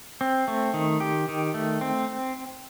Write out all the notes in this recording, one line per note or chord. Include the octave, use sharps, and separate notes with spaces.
C4
A3
D#3
G4
D#3
A3
C4